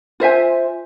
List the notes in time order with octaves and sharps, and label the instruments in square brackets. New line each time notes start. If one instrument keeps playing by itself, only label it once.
[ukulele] F4 C5 E5 G#5